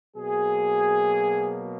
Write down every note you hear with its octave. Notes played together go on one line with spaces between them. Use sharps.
B2 F#3 A#3 G#4